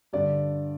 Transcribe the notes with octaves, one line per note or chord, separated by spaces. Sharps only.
G2 D3 D5